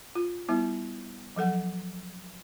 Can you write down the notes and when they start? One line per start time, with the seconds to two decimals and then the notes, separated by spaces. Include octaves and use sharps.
0.15 F4
0.49 G3 B3 E4
1.36 F3 F#3 A4 F#5